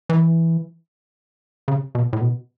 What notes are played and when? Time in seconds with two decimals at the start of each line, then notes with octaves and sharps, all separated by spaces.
0.09 E3
1.68 C#3
1.95 B2
2.13 A2
2.21 B2